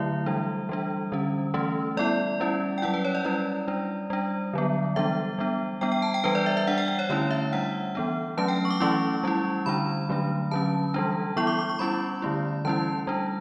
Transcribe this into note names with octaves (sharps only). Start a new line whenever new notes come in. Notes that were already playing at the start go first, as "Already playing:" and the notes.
Already playing: D3 F#3 A3 E4 E5
E3 G3 D4
E3 G3 D4
D3 G3 C#4
E3 A3 C#4
G3 B3 E4 D5
G3 C#4 E4
G5
F#3 C#4 E4 F#5
B4
C#5
D5
G3 C#4 E4 D5
G3 D4
G3 D4
D3 F#3 B3
E3 G3 B3 D4 E5
G3 B3 D4
G3 B3 D4 G5
G5
A5
G5
E3 G3 D4 B4
D5
E5
E5
G3 D4 F#5
G5
G5
C#5
D3 A3 C#4 E4 C#5
E5
G3 D4 F#5
E3 B3 D4
F#3 A3 C#4 A5
G5
C#6
D6
E3 A3 C#4 E4 C#6
G3 C#4 E4
D3 G3 D4 B5
D3 F#3 A3 D4
D3 F#3 C#4 A5
E3 G3 D4
E3 B3 E4 C#6
D6
D6
C#6
G3 C#4 E4 B5
D3 A3 E4
E3 G3 C#4 E4 A5
G3 D4